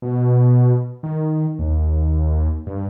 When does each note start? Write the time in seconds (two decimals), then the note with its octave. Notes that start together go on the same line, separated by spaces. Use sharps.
0.02 B2
1.03 D#3
1.59 D#2
2.66 G2